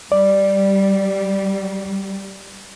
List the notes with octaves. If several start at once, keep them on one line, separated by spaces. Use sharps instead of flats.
G3 D5